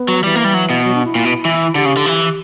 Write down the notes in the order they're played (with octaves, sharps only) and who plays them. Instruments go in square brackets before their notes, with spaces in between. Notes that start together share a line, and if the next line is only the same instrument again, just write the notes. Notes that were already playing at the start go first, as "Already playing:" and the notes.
Already playing: [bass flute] B3
[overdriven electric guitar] F#3
[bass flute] E3 [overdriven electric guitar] G3
[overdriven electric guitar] A#3
G3
F#3
B2
[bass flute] F#3
D4
E4
[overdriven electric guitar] A#2
B2
E3
[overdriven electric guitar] D3 [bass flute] G4
[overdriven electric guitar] C#3
D3
E3